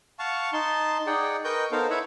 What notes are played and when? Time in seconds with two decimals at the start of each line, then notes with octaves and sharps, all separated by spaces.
0.19 F5 F#5 A5 C#6
0.53 D#4 A5 C6
1.07 D#4 G#4 D5 F#5 G5
1.44 A#4 B4 D#5 G5 C#6 G6
1.72 B3 D#4 A4 A#4 C5 F5
1.90 E4 B4 C#5 E5 F#5 B5